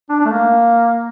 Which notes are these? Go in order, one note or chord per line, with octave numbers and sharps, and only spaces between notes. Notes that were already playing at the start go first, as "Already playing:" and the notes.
D4
D4
A3
A#3